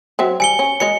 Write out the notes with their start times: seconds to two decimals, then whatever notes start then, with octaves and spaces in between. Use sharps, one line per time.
0.19 F#3 C4 E5
0.40 G3 G#5 C#7 G7
0.59 C#4
0.80 G#3 C#5 D#5 C#7